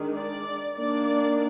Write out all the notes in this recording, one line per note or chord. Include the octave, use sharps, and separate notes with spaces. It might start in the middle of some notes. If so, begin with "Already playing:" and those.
Already playing: D#3 G#3 D4
D5
D#3 A#3 D4 D5